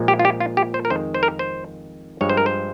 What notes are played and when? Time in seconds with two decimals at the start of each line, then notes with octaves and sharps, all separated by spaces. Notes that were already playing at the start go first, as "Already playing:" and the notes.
Already playing: A#2 F3 G#3
0.08 G4
0.19 F4
0.25 G4
0.40 F4
0.57 G4
0.74 C5
0.85 A#4
0.90 F2 D#3 G#3 C5
1.14 C5
1.23 A#4
1.39 C5
2.21 G2 F3 G#3 C#5
2.29 C5
2.37 A#4
2.46 C5